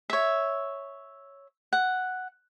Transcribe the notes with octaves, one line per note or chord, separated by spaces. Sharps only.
C#5 E5
F#5